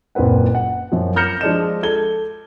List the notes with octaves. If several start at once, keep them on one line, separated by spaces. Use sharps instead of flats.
F#1 A#2 C4 B4 F#5
F#5
F#2 F3
F6 G6 A#6 C#7 E7
F3 G#3 D4 D#5 E7
A4 G#6 G7